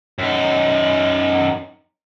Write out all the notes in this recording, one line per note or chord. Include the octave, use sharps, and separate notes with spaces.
F#2 D#4